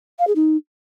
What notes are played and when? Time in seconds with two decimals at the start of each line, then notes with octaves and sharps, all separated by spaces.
0.19 F5
0.27 G#4
0.35 D#4